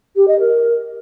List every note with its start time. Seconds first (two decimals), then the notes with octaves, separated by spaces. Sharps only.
0.15 G4
0.27 D#5
0.39 A#4